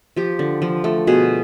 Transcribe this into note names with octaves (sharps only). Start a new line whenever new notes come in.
F3 G4
D3
F3
A3
B2 G#4